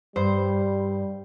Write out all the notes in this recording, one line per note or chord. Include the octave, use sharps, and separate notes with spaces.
G2 G3 C5